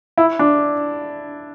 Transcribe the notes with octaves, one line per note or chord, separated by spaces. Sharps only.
E4
D4